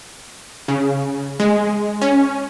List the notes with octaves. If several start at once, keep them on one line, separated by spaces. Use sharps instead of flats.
C#3
G#3
C#4